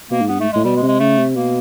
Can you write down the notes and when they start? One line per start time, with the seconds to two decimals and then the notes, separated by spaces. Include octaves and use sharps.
0.11 B2 A#3
0.21 G#2
0.29 G2 B3
0.38 G#2 A3
0.53 A2 G#3
0.64 B2 G3
0.76 G#3
0.82 C3
0.88 G#3
1.00 C#3 A3
1.17 C3
1.36 B2 A#3